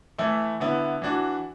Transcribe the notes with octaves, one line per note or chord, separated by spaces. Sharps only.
E3 A3 E4
D3 B3 E4
E3 D4 F#4